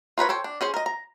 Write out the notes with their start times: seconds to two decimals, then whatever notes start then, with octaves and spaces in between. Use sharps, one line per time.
0.18 F4 A#4 B4 C#5
0.29 A4 C5 C#5 G5
0.44 D4
0.61 C#4 G#4 C5
0.74 A#4 D#5
0.86 A#5